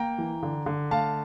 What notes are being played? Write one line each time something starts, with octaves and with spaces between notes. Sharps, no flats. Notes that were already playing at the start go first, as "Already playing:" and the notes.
Already playing: A#3 G5 A#5
E3
D3
D3
A3 F5 A5